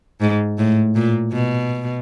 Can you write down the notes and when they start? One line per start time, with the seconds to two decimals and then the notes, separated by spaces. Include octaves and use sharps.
0.21 G#2
0.58 A2
0.95 A#2
1.33 B2